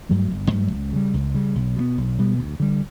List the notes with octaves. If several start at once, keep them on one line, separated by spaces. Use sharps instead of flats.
G2 F#3 A3
G1
G2 F#3 A3
C#2
C#3 G3
C#2
C#3 G3
B1
B2 G3 B3
B1
B2 G3 B3
D2
D3 G3